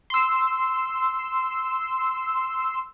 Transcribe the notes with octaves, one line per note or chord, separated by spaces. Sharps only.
C6 E6